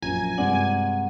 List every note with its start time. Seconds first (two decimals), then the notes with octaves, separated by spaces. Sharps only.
0.02 A#1 F#2 G#5 A#5
0.38 G2 C3 G#3 D5 F#5